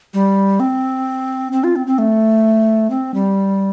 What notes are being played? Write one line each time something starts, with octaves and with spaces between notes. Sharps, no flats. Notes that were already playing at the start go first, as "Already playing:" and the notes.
G3
C4
C4
F4
C4
C4
A3
C4
G3